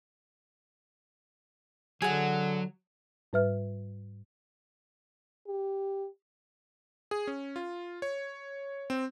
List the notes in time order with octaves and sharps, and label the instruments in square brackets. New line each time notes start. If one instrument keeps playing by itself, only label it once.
[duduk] D3 [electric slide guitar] F#3 [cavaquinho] G#4 F#5
[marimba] G#2 G3 B4 E5 F6
[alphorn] G4
[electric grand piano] G#4
C#4
F4
C#5
C4